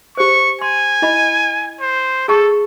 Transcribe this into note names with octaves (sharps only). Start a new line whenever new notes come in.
G4 C5 C#6
G#5 C6
E4 D#5 B5
C5
G#4 A4 A5 C#6